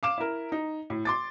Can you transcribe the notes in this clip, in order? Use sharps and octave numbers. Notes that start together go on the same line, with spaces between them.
F5 D6 E7
E4 A#4
D#4
A2
C6 D6 A6